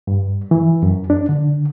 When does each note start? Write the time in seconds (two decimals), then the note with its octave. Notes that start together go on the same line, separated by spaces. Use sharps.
0.07 G2
0.51 E3
0.83 F#2
1.10 D4
1.29 D3